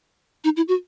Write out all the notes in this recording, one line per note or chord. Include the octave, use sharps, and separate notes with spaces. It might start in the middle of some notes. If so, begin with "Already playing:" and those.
D#4
E4
F#4